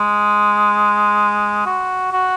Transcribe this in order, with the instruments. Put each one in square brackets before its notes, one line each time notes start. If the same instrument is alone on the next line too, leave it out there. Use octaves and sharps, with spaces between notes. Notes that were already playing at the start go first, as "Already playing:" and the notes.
Already playing: [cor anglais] G#3
F#4
F#4